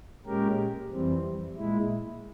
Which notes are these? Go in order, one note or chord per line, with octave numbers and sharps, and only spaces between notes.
A#2 G#3 C#4 G4 A#4
F2 E3 G3 C4
A#2 G#3 E4